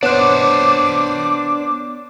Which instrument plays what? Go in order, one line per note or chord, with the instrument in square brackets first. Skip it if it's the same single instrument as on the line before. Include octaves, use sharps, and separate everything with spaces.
[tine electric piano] B3 [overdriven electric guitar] D4 C5 [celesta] C#5 F#6 [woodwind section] D6